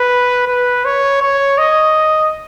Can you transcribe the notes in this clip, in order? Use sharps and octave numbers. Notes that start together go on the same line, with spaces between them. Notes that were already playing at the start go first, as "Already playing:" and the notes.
Already playing: B4
B4
C#5
C#5
D#5